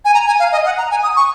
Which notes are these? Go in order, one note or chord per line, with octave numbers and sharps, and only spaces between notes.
G#5
A#5
G#5
F5
D#5
F#5
A#5
G#5
D#6
C#6